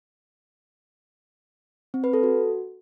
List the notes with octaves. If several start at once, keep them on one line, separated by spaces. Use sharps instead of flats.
C4
B4
A4
F#4